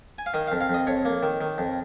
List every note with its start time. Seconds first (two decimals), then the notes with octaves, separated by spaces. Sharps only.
0.18 G#5
0.26 F5
0.34 D#3 D#5
0.47 F2 F5
0.61 F5
0.70 F2 D#5
0.87 F2 C#5
1.05 A#3
1.23 D#3
1.41 D#3
1.58 F2